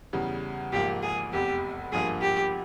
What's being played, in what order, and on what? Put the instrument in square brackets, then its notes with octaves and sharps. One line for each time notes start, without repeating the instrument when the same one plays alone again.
[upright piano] E2 C#3 E3 G3
[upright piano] G#1 G#2 F3 A#3 [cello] G4
[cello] G#4
[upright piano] F1 E2 C3 [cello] G4
[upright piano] G#1 G2 F3 A#3 [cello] G#4
[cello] G4